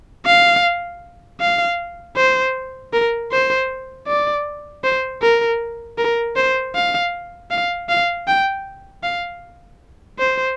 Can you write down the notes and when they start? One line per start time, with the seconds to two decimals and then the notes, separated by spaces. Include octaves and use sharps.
0.25 F5
1.40 F5
2.16 C5
2.93 A#4
3.31 C5
4.07 D5
4.83 C5
5.22 A#4
5.98 A#4
6.36 C5
6.75 F5
7.51 F5
7.89 F5
8.27 G5
9.03 F5
10.18 C5